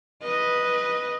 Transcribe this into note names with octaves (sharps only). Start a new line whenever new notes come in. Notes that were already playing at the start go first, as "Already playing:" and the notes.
B4 D#5